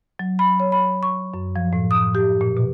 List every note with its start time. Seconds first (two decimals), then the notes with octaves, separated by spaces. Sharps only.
0.19 F#3
0.39 B5
0.60 C#5
0.72 B5
1.03 C#6
1.34 F#2
1.56 F3
1.73 A2
1.91 D#6
2.15 G4
2.41 A#2
2.57 B2